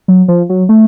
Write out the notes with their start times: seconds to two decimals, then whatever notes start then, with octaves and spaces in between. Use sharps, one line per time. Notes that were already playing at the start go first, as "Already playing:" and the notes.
0.08 F#3
0.28 F3
0.49 F#3
0.69 A3